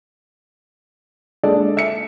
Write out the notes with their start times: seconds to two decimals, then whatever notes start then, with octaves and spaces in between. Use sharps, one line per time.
1.43 G#3 D4 A4 D5 D#5
1.77 E5 C#7